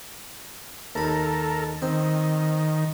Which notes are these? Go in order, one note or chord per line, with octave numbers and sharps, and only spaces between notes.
D#2 A4 A#4 B5
D#3 C4